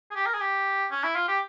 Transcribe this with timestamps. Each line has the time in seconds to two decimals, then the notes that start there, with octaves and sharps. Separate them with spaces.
0.11 G#4
0.15 G4
0.26 A#4
0.34 G#4
0.41 G4
0.91 C#4
1.04 E4
1.16 F4
1.28 G4